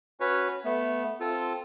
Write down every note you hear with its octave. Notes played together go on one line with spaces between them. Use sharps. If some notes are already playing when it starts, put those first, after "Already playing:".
C#4 F#4 B4 C#5
A3 B3
C4 F4 A4